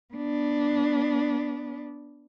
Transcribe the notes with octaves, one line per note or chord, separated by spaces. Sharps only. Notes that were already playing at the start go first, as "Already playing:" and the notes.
B3 D4